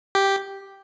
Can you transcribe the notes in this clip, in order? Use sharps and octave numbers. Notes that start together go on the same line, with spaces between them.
G4